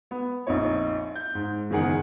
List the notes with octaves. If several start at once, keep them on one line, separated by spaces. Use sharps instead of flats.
B3
A#1 F2 D#4 C#5
G6
G#2
F#1 E2 D#3 G#4 F#5